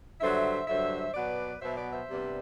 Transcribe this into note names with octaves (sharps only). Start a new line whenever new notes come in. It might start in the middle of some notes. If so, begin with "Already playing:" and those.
G2 D3 F#3 C5 E5
G2 D3 F#3 C5 E5
B2 F#3 B3 B4 D5
B2 F#3 B3 C5 E5
B4 D5
C5 E5
C3 G3 B3 D4